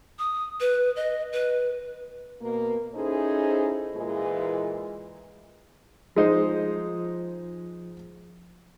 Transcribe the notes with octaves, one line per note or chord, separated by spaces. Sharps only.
D#6
B4
D#5
B4
B2 A#3
C#4 D#4 E4 G#4 A4 C5
A#2 E3 G#3
F3 G#3 D#4 C5